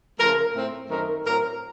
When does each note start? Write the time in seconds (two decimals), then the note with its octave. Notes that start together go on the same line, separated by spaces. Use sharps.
0.19 C#3 F3 A3 A#4
0.55 A2 A3 C4
0.89 F#2 D#3 A3 C4 A#4
1.25 A2 F#3 C4 A#4